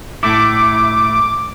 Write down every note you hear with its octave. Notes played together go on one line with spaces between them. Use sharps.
A2 A3 E4 D6